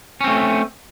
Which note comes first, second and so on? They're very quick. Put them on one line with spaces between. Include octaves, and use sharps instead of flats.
C#4 C4 A3